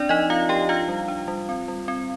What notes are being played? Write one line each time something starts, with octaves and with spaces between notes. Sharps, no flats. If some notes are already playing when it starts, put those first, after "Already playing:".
Already playing: C4 D4 D5
F3 D#4 D#5
C4 F4 F5
F3 G4 G5
D4 F4 F5
G3
D4
G3
C4
G3
C4